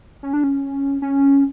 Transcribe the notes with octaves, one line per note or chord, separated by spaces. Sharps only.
C#4
D4
C#4
C#4